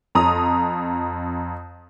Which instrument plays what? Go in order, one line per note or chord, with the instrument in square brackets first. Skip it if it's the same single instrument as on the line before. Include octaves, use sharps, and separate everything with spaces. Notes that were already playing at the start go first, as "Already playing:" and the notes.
[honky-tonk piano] F2 A#5 D#6